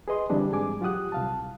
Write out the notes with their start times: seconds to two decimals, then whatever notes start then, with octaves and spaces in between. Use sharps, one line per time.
0.08 G#4 B4 D#5 C6
0.30 D3 E3 G3 C4 D4 G4
0.52 G#2 G#4 G#5 D6
0.81 F#3 F4 G4 F#5 D#6 F#6
1.12 C2 F5 A5